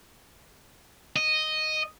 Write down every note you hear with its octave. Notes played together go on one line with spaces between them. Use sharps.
D#5